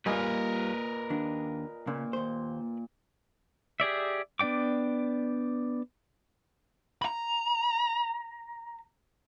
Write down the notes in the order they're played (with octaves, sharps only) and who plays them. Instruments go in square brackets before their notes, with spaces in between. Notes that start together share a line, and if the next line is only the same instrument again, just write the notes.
[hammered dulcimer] A#2 D#5 G#5 [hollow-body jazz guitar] G3 F4 [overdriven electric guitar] A#4 B4
[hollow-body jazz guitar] D#2 D4
[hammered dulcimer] A#2 [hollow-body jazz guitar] C#3
[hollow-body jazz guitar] D#2 C5
[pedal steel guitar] G4 G#4 D5 E5
B3 D4 D5 G5 D6
[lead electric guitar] A#5 B5